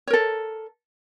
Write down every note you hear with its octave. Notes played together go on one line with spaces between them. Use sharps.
A4 A#4 C#5